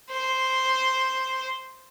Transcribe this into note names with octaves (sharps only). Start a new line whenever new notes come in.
C5